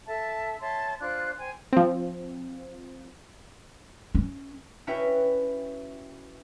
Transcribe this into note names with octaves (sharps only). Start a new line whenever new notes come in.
A4 E5 A5
C#5 E5 A5 C6
D4 F4 C5 F#6
C5 G5 G#5
F3 C4
C#4
C#4 E4 F#4 B4 E5 G5